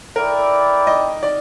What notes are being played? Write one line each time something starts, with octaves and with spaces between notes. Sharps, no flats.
E4 A4 A#4 D5 G5
D#5
D5